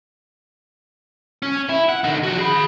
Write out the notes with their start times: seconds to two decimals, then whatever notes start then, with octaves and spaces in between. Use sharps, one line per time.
1.43 C#4
1.69 E4
1.89 F#5
2.04 D3 D#4
2.23 F3 F#4
2.38 G#4 B5